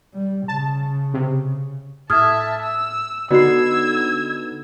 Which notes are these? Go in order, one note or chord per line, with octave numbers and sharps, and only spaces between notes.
G3
C#3 A5
C3
A2 E5 A5 D#6 F6 G#6
E6
D3 B3 D#4 F#4 E6 G#6 C7